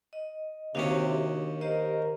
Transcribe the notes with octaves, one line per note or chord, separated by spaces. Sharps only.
D#5
D#2 C3 D#3 C#4 D4 F#4
G4 A#4 C5 D#5